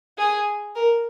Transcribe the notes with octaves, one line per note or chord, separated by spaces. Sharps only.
G#4
A#4